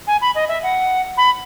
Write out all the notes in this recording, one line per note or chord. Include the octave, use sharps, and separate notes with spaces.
G#5
B5
D#5
E5
F#5
B5